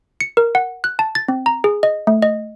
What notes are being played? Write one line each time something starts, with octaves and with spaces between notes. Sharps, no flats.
C#7
A#4
F#5
F#6
A5
A6
C4
A#5
G#4
D#5
A3
D#5